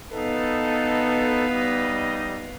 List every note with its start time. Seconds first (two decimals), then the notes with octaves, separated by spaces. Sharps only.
0.13 B3 D#4 A4 B4 F5
1.51 G3 D#4 D#5